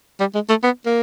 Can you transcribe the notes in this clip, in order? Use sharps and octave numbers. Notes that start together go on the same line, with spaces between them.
G3
G#3
A3
B3
A#3